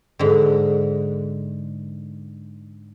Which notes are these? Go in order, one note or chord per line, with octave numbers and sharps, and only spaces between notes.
G#2 D3